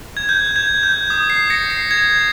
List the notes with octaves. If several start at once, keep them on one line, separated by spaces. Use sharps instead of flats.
G#6
G6
G#6
G6
D#6
C7
A#6 C#7
C7
G#6